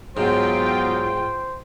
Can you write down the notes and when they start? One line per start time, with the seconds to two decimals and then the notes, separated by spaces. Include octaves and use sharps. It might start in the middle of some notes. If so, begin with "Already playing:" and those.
0.17 G#2 F#3 B3 F4 C5 G5